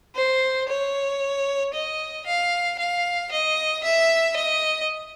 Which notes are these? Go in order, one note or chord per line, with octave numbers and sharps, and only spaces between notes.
C5
C#5
D#5
F5
F5
D#5
E5
D#5